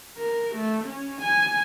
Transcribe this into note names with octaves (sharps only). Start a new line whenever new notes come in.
A#4
A3
C#4
G#5